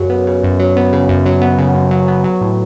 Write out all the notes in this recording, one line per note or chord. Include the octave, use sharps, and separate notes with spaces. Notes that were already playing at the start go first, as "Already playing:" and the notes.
Already playing: F#2 C#3 F#3
B3
C#3
F#2
F#3
B3
C#3
F#2
F#3
B3
C#3
F#2
F#3
B3
F#3
A2